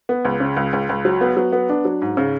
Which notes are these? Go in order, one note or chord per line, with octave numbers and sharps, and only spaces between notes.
B3
C#2
C#3
C#2
C#2
C#2
F#3
B3
F#3
B3
D4
F#3
G#2
C#3